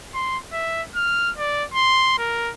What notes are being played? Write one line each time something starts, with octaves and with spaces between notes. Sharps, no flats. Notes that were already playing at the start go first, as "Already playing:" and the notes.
C6
E5
F6
D5
C6
A#4